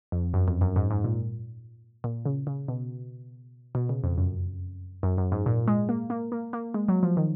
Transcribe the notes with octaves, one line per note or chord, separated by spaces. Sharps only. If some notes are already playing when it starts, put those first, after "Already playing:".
F2
F#2
F2
F#2
G#2
G#2
A#2
A#2
C#3
C#3
B2
B2
C#3
F2
F#2
F#2
F#2
G#2
A#2
G#3
A#3
A#3
A#3
A#3
G#3
F#3
F3
D#3